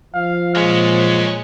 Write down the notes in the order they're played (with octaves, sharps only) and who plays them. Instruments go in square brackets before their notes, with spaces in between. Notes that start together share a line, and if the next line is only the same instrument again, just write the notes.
[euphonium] F3 [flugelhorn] F5
[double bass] A#2 [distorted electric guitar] F#3 C#4 [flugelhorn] G#3